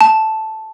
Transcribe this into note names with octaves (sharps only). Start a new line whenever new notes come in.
A5